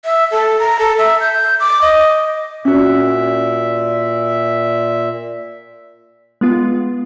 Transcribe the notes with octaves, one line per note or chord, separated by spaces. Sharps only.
E5
A4
A#5
A4
E5
G6
D6
D#5
A#2 C#4 F#4 E5
G#3 B3 F4